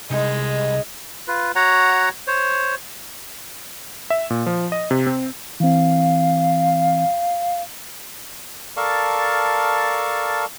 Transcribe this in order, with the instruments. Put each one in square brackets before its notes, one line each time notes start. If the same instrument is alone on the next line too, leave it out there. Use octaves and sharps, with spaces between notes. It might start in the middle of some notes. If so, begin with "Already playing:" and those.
[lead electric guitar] C2 [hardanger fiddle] G#3 [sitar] D#4
[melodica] F4 B4
F#4 C#5 F#5 A#5
C5 C#5
[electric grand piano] E5
A#2
F3
D#5
C3
C4
[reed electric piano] E3 C4 [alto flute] F5
[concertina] A4 A#4 D5 F5 A5 C#6